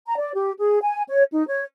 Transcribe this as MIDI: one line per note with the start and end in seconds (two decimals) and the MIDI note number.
0.06 0.16 82
0.18 0.32 74
0.34 0.51 67
0.58 0.77 68
0.82 1.02 80
1.08 1.23 73
1.33 1.46 63
1.47 1.64 73